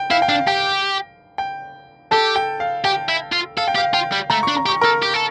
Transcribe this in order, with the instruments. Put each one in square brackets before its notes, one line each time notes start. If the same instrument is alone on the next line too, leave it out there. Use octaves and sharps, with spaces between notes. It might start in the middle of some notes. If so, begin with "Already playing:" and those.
Already playing: [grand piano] G5
[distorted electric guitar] E4 [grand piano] F5
[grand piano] G5
[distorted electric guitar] D4 [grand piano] F5
[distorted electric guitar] G4 [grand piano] G5
[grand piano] G5
[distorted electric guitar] G4 [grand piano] A4 A5
[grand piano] G5
F5
[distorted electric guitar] G4 [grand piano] G5
[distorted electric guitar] E4
F4
[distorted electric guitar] A4 [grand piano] F5
[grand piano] G5
[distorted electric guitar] G4 [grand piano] F5
[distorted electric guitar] F4 [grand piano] G5
[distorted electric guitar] G3
[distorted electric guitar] A3 [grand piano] A#5
[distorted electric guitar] D4 [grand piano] C#6
[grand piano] A#5
[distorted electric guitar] G4 [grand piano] C#6
[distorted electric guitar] A4 [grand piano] A#4 A#5
[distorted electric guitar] G4
A4